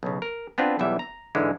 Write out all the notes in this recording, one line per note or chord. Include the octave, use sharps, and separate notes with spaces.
B1 C#3
A#4
B3 C4 D4 F4 B4
B1 E2 E3 G3 E5
A#5
G#2 D3 E3 G#3